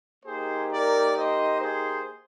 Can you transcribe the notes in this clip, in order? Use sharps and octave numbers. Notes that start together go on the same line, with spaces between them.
A#3 D#4 G4 G#4 C5
A#4 D5
C5 D#5
G#4 C5